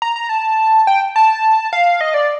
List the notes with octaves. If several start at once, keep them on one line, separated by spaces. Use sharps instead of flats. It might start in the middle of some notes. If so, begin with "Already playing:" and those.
A#5
A#5
A5
G5
A5
F5
D#5
D5